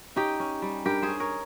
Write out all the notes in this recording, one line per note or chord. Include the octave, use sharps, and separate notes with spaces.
C#4 D#4 G4
C#4
G3
G2 G4 A#4
G#4 C5
C#4
A#4 C#5